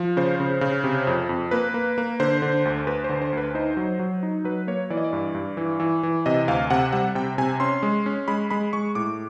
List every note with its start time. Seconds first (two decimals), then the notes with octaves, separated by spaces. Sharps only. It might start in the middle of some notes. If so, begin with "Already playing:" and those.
Already playing: F3
0.17 C#3 C5
0.40 C#3
0.61 C#3
0.84 C3
1.07 F2
1.29 F2
1.51 A#3 B4
1.74 A#3
1.98 A#3
2.20 D3 C5
2.42 D3
2.65 D2
2.87 D2 B4
3.04 C5
3.09 D3
3.22 C5
3.33 D2 B4
3.55 D#4 C5
3.77 F#3
3.99 F#3
4.23 D#4
4.44 F#3 B4
4.67 A#3 C#5
4.90 E3 D5
4.97 D#5
5.04 D5
5.13 G2
5.35 G2
5.57 E3
5.80 E3
6.03 E3
6.26 C3 D#5
6.48 D2 F5
6.70 C3 F#5
6.92 G3 F#5
7.15 C3 G5
7.38 C3 G#5
7.60 C#4 C6
7.83 G#3
8.06 C#4
8.28 G#3 B5
8.51 G#3 B5
8.73 G#3 C#6
8.95 A2 D6